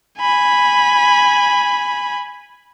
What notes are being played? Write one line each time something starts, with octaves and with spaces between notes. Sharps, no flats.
G#5 B5